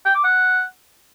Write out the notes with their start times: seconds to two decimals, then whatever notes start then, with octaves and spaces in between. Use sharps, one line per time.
0.06 G5
0.15 D6
0.24 F#5